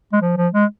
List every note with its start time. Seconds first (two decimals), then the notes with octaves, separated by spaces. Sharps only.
0.13 G#3
0.22 F3
0.37 F3
0.54 G#3